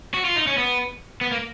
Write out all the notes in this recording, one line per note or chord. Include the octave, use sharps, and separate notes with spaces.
F#4
F4
D#4
C#4
B3
B3
A#3